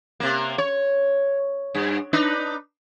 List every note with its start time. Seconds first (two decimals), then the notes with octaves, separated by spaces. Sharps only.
0.20 C3 A#3
0.58 C#5
1.75 G2
2.13 D4 D#4 B4